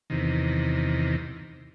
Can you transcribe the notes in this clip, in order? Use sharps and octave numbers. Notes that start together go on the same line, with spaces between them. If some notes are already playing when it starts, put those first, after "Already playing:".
E2 C3 D#3